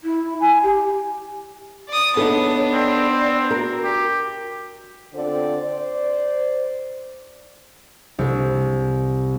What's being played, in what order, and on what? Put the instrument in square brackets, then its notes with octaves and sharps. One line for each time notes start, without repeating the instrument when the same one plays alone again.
[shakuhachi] E4
G#5
G4
[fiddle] D5 D#6
[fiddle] B3 D4 [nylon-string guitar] D#4 A4 [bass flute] C#5
[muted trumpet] C4 [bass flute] D5
[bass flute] F#4 [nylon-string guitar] A#4
[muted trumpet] G4
[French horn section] D3 C4 F4 A4 C5 D5
C5 D5
[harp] C2